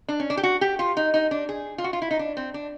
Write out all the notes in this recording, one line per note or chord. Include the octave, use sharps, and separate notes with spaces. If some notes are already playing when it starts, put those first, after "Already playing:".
D4
C#4
D4
G4
F#4
G4
F4
D#4
D#4
D4
G#4
F4
F#4
F4
E4
D#4
D4
C4
D4